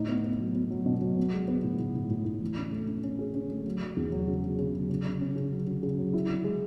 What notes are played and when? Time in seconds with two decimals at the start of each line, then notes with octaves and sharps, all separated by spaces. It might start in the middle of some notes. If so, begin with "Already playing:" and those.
Already playing: A2 D#4
0.08 B3
0.24 B3
0.39 F#3
0.55 B3
0.71 F#3
0.86 B2
1.01 F#3
1.17 B3
1.33 G#3
1.48 B3
1.63 A2
1.79 A2
1.95 A2
2.10 A2
2.25 A2
2.42 E3
2.57 C#4
2.72 A3
2.88 C#4
3.04 C#4
3.19 G#4
3.34 C#4
3.50 A3
3.66 F#3
3.81 F#3
3.96 E2
4.12 F#3
4.28 C#3
4.43 F#3
4.59 C#3
4.74 F#3
4.89 C#3
5.05 C#3
5.21 C#4
5.36 C#3
5.52 F#3
5.67 C#3
5.83 C#3
5.98 F#3
6.13 E4
6.29 E4
6.44 G#3